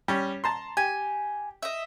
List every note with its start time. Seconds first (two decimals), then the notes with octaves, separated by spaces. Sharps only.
0.08 G3 C#4
0.44 A5 A#5 C6
0.77 G4 G#5
1.62 D#5 E5